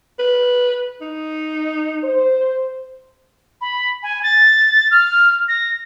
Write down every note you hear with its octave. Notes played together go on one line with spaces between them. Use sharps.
B4
D#4
C5
B5
G#5
A6
F6
A#6